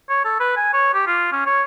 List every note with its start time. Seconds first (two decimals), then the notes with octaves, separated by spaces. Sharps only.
0.09 C#5
0.25 A4
0.40 B4
0.57 G#5
0.74 C#5
0.94 G4
1.07 F4
1.32 C#4
1.46 C#5